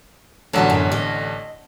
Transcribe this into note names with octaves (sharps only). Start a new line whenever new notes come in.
A1 E2 D3 F#3 C#4 A5
F#2
D#5